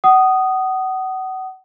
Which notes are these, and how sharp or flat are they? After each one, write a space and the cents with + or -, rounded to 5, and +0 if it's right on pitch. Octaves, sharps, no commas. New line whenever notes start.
F#5 +30 D#6 -5